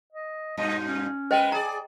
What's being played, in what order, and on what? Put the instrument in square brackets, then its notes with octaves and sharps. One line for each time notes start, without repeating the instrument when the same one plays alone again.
[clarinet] D#5
[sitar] G2 B2 D#4 [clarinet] D#5
[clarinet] C#4
[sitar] G#3 B4 [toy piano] C5 D#5 G5
[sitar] G#4 D5 [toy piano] A#5